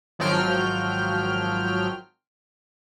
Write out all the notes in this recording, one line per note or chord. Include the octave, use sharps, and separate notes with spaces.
G#1 F3 F#3 G5 F6